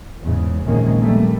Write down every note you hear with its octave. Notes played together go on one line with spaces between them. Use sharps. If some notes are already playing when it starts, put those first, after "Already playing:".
E2 G#2 C#3
A#1 C3 D#3 G#3 A#3 C#4
A#1 G3 A3 A#3